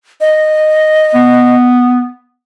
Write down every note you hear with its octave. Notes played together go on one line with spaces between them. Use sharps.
D#5
B3